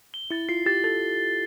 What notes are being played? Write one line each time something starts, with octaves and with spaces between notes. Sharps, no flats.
G7
E4 A6
F4 C7
G4 A6
A4 A6